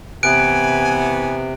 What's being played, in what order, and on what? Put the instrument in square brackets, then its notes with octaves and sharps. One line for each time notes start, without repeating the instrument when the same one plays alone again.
[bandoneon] C3 [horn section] E3 B3 [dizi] G#5 [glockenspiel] F#6 D7